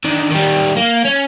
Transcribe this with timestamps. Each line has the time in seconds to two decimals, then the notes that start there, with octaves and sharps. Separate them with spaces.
0.04 D3 D#3
0.31 D#3 G3
0.76 A#3
1.05 C#4